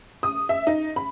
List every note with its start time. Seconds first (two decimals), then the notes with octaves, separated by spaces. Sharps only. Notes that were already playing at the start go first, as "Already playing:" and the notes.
0.23 D#6
0.49 E5
0.67 D#4
0.96 B5